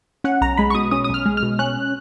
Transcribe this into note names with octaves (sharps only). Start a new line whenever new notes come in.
C#4 F#5
B1 A#5
G#3 B5
C#6
B2 D#6
C#4 D#6
B1 D#6
F6
G#3
F6
B2
C#4 F#6